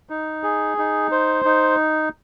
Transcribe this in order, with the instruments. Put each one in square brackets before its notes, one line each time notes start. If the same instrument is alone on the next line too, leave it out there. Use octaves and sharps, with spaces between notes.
[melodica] D#4
G#4
D#4
C5
D#4